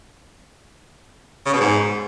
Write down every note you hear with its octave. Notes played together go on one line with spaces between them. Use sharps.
C#3
B2
G#2